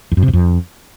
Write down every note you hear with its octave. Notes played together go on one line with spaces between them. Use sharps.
E2
F#2
C3
F#2
F2